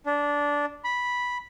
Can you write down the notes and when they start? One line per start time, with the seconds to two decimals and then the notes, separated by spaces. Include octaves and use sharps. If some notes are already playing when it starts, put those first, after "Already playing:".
0.06 D4
0.84 B5